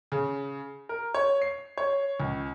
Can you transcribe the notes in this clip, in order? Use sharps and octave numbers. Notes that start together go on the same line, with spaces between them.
C#3
A#4
C#5
C7
C#5
C#2